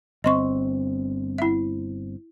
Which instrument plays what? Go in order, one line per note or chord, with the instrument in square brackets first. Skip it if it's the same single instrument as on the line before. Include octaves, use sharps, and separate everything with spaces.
[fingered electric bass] G1 C4 [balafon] D#5 C6 C#6
[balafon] E4 E5